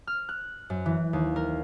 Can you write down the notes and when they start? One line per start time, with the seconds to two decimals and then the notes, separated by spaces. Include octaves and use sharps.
0.07 F6
0.29 F#6
0.70 F#2
0.86 E3
1.13 D#2
1.36 A#4